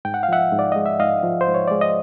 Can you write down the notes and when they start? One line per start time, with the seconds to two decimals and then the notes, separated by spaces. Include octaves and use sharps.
0.05 G#2 G5
0.14 F#5
0.23 F5
0.29 F3 E5 F#5
0.52 G#2
0.59 D5
0.72 G#3 D#5
0.86 E5
1.00 G#2 D#5 F5
1.23 F3
1.41 C5
1.47 G#2
1.54 C#5
1.68 G#3 D5
1.81 D#5